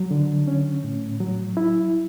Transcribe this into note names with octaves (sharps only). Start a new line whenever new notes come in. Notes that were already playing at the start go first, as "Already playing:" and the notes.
Already playing: F#3
D3
C#4
A2
F#3
E4